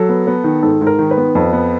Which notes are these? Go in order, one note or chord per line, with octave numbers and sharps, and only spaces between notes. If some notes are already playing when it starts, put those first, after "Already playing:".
Already playing: F#3 A4
B3
B3
D#3
G#2 A4
G#2
A#4
D#3
B4
B3
F2
B3